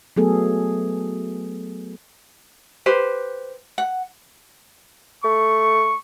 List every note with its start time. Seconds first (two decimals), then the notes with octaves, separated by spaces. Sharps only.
0.16 F#3 A3 B3 G#4 A4
2.86 G4 B4 C5
3.78 F#5
5.24 A3 C#6